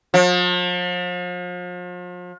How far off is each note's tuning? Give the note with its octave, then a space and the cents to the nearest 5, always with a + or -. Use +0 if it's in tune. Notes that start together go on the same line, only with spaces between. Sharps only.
F3 +40